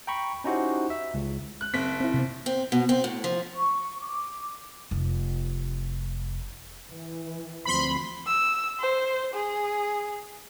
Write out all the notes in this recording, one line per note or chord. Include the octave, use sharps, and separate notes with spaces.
G5 A#5 B5 C#6
C#4 D#4 E4 F#4 G4 C5
E5
C#2
F#6
F#1 C4 B6
C4 E4
C3 B3
C4
B2
C4
A2
F3
C#6
D6
F1 F4
E3
D2 F3 C4 B5 C6
E6
C5
G#4